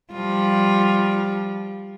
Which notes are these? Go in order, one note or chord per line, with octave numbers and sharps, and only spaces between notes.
F3 G3 F4